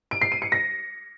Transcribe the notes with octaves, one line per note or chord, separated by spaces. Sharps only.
D7
C7
D#7
C#7
A#6